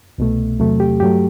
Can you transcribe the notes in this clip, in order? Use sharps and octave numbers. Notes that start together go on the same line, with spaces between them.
C2 B2 A3
E2 C3 F#3 A3
G4
G2 F#3 A3 G4